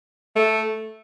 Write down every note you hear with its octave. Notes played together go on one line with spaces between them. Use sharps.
A3